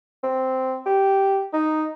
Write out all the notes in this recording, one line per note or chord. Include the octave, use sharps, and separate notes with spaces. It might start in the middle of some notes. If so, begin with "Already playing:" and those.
C4
G4
D#4